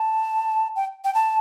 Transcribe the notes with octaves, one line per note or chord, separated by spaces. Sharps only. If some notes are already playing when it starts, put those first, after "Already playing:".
Already playing: A5
G5
G5
A5